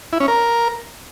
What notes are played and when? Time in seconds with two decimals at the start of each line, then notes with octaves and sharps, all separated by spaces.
0.13 E4
0.20 C#4
0.28 A#4